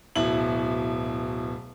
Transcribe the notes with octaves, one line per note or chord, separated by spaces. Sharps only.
D1 B2 E4 F#7